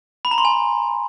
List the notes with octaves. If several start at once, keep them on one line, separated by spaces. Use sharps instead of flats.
B5
A#5
C6
G#5